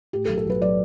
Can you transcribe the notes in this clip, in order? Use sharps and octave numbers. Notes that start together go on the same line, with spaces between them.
A2 G4
A4
B1
A4
B1 B4
F#3 D5